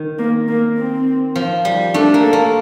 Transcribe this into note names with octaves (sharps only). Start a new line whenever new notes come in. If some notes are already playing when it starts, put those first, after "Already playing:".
Already playing: D#3
A#3
A#3
C4
F3
G3
A3 D4
A#3
A4
A#3